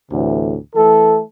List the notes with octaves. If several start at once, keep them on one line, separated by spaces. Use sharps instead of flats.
D2 A2 C3 E3
E3 A3 A4